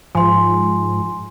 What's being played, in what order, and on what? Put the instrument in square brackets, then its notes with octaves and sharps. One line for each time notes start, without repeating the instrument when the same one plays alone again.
[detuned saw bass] G#2 [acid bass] F3 [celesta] G#5 C6